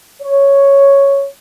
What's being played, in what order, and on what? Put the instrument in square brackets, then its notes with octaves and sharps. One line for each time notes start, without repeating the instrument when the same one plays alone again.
[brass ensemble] C#5